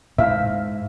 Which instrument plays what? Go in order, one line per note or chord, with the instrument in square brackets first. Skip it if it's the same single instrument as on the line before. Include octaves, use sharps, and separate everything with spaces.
[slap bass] G#2 [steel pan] E5 F5